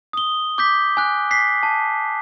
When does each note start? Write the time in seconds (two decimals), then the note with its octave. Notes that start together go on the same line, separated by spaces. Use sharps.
0.13 D#6 G7
0.58 D6 G6 B6
0.97 G#5 F#6
1.31 B6 C7
1.63 A5